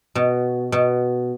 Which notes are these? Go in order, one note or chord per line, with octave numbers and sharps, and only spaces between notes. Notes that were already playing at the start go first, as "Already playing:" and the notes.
B2
B2